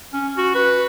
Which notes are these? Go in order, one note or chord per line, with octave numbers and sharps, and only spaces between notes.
C#4
F#4
B4